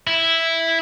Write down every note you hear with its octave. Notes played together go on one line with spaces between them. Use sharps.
E4